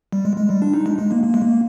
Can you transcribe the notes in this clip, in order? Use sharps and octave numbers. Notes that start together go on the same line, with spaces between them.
G3
G#3
G#3
G3
D4
D#4
G#3
G#3
A#3
A#3
G#3
A#3